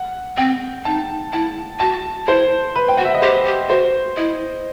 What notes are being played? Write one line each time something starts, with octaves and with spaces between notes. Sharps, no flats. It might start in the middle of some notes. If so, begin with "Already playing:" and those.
Already playing: F#5
C4 G5
D#4 A5
E4 A5
F#4 A5
E4 C5
B4
G5
F#4 F#5
E5
D#5
G4 C5
G4
F#4 C5
E4 D#5